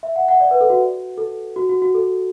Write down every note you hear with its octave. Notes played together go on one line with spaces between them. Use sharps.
E5
F#5
F#5
D5
B4
A4
F#4
A4
F#4
F#4
F#4
A4